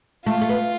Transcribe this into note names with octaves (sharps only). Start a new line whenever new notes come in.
A3 F4
A3
B3